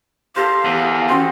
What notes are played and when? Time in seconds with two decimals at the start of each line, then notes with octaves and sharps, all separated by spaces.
0.36 G4 A4 A#4 C5 F5
0.65 E2
1.09 C4 C#4 F#4